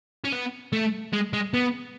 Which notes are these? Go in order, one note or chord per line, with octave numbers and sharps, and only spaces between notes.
C#4
B3
A3
G#3
G#3
B3